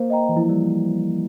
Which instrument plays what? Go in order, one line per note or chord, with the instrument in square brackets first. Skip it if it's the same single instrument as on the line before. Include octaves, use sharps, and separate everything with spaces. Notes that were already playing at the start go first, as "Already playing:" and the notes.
Already playing: [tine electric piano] A#3 [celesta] C5
[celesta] D#5 G5 A#5
[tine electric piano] E3
[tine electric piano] F3 [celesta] E4
[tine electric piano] G3